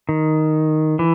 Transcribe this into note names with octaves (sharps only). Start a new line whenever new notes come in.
D#3
E3